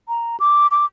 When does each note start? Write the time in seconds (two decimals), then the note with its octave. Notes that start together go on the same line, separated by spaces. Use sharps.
0.08 A#5
0.40 D6
0.71 D6